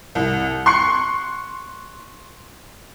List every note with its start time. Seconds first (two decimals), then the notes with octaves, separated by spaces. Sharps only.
0.15 C2
0.66 C6 C#6 F#6 C7 C#7